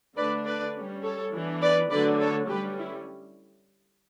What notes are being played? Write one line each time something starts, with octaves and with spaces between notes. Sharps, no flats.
D3 A3 D4 B4 D5
B4 D5
G3 C#4
A4 C#5
E3 B3 D4
B4 D5
D3 F#3 A3 B4 D5
A4 C#5
D3 G3 C#4 G4 B4
E4